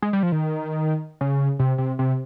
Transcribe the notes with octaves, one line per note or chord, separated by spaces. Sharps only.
G#3
G3
F3
D#3
C#3
C3
C3
C3